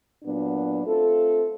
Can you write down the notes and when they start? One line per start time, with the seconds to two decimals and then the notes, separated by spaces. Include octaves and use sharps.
0.23 A#2 F#3 B3 D4
0.85 A3 C4 F4 A4